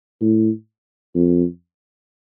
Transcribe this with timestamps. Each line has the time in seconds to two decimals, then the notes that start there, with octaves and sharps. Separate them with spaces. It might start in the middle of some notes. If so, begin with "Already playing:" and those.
0.21 A2
1.15 F2